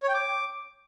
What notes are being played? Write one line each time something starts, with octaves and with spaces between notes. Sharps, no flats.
C#5
G5
D6